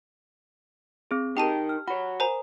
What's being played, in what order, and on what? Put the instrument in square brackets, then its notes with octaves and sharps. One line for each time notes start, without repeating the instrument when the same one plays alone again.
[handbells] C4 G#4
[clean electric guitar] D#4 A#4 [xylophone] G4 A5 D#7 [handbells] G5
[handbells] F6
[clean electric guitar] F#4 C#5 [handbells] F#5 B5
[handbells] A#4 [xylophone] C5 G#5 A#5